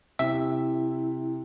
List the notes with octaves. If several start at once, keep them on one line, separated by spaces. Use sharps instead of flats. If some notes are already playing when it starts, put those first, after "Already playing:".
C3 E4 E5